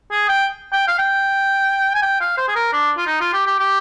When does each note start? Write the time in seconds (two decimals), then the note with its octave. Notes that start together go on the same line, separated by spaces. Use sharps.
0.11 G#4
0.29 G5
0.73 G5
0.88 F5
0.99 G5
1.95 G#5
2.02 G5
2.21 F5
2.37 C5
2.48 G#4
2.55 A#4
2.73 D4
2.97 F4
3.07 D#4
3.21 F4
3.33 G4
3.47 G4
3.60 G4